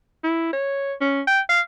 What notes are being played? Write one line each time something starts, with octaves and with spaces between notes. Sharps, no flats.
E4
C#5
C#4
G5
F5